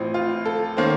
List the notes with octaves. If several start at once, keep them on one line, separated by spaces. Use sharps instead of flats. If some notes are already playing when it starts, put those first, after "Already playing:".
Already playing: A1 A2 F3 C4
F4
A4
D#3 A#3 C#4 C5